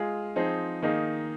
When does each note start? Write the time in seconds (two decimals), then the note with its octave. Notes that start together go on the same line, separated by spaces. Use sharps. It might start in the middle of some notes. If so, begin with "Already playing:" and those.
Already playing: G#3 F4 G#4
0.36 F3 C4 D#4 G#4
0.82 D#3 A#3 D#4 G#4